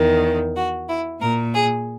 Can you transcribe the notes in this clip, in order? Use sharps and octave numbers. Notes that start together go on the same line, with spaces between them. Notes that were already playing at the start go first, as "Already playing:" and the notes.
Already playing: E2 D#3
F#4
E4
A#2 A#4
G#4